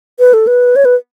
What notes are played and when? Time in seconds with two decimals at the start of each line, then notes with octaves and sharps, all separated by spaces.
0.19 B4
0.33 A4
0.47 B4
0.76 C#5
0.85 B4